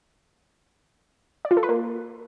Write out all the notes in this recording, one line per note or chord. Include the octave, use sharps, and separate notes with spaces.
D5
F4
A4
B4
A#3